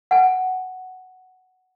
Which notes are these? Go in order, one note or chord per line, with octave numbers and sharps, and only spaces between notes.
F#5 G#5